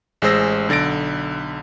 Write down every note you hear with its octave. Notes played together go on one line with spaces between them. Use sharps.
A1 G#3 G#4 C5 E6 A#6
B1 D3 A6 A#6 D7